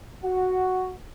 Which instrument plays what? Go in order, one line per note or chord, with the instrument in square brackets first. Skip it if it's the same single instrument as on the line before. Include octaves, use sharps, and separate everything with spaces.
[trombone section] F#4